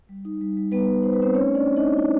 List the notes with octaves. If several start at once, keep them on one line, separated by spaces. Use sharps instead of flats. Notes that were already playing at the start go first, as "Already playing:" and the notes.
G3
D#4
G3
G3
G3 B3 B4
G3
D#4 C5
B4
C4 D#4 C5
A3 C#4 C#5
A3 D4 D5
C4
D#4 D#5
E4
E4